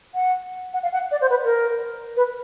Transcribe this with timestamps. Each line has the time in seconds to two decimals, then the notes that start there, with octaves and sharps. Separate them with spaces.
0.15 F#5
0.74 F#5
0.83 F5
0.93 F#5
1.11 D5
1.21 C5
1.30 B4
1.44 A#4
2.17 B4